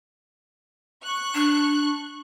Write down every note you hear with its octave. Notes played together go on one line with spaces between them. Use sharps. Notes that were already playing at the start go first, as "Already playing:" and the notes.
C#6 F#6
D4